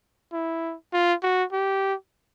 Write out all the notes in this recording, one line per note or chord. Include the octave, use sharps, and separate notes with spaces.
E4
F4
F#4
G4